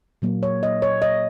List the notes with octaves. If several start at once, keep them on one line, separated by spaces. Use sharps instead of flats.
A#2 F#3 A#3
C#5
D#5
C#5
D#5